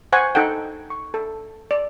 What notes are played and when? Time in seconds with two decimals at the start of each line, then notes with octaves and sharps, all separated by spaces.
0.13 C5 F#5 G#5 C#6
0.35 D#4 A4 F#5 G5
0.90 C#6
1.14 A4
1.71 D5